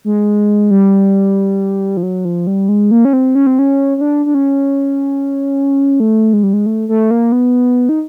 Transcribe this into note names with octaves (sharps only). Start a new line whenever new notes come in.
G#3
G3
F3
F#3
F3
G3
G#3
A#3
C#4
C4
C#4
C4
C#4
C#4
D4
D4
C#4
A3
G#3
G3
G#3
A3
A3
A#3
B3
D#4